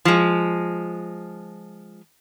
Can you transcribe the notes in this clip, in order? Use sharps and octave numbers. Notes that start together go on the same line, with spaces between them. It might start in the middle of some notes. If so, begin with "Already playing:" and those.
F3 G#3